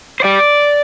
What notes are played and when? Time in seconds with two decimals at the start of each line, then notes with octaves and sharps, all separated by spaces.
0.20 C5
0.24 G3 D5